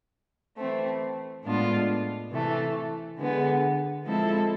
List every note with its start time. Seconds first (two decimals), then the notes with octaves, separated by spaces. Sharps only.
0.57 E3 A3 C4
1.44 A2 G#3 B3 D4 F4
2.31 C3 E3 A3
3.18 D3 G#3 B3
4.04 F3 G#3 C4 E4 A4